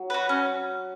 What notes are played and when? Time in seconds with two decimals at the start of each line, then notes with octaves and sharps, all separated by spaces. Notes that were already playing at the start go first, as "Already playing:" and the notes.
Already playing: F#3
0.10 F#4 B4
0.29 C#4